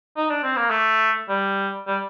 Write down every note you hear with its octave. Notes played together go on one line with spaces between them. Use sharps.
D#4
D4
C4
A#3
A3
G3
G3